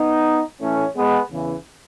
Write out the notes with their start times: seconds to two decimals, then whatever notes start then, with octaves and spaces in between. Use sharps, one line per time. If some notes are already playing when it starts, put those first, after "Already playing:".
Already playing: B3 D#4
0.61 A2 E3 A3 C#4
0.96 G#3 B3
1.31 E2 C#3 E3